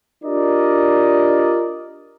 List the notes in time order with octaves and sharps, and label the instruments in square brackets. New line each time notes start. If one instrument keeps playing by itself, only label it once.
[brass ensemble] D4 F4 G4 A#4 D5 D#5